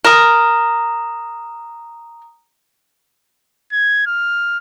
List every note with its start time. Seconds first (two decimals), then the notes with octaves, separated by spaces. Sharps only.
0.05 A#4 A#5 D#6
3.72 G#6
4.06 F6